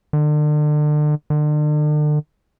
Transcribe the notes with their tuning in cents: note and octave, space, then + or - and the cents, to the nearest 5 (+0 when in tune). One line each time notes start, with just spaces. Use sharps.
D3 +35
D3 +40